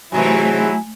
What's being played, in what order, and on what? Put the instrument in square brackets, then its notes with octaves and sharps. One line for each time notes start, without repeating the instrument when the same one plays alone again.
[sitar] G#2 C3 E3 [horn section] F#3 E4 [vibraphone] A3 G#5